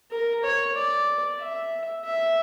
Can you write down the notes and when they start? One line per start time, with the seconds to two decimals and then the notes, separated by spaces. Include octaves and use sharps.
0.11 A#4
0.43 C#5
0.75 D5
1.40 E5
2.05 E5